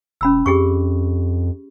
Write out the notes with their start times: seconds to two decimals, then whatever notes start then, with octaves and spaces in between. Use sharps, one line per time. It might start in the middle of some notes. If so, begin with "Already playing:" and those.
0.21 E1 C#4 B5 E6
0.46 F2 G4 G#4 C#6